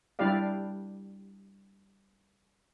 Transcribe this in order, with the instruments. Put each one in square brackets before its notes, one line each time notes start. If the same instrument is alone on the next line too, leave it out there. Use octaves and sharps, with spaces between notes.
[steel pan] G3 D4 E4 G4 D5 F5